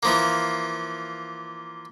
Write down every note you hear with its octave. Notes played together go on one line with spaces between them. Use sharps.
E3 F3 A#3